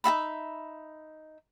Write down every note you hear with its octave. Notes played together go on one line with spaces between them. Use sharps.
D#4 F#4 E5 B5